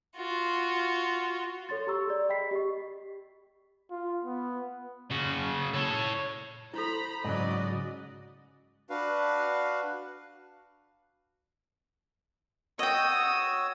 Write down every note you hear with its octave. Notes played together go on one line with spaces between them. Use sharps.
F4 F#4
A4 C#5 C6 A6
G4 A#5 C#6 E6
G#4 D5
D#5 G5 B5 B6 C7
G4 D#5 C#6
F4
B3
C#3 F#4
A4 C#5
E4 A4 C5 A#5 B5
G#2 C#3 F#3 F#4 D5 D#5
D4 F#4 B4 F5
F#4 C#5 D#5 G5 D#6 E6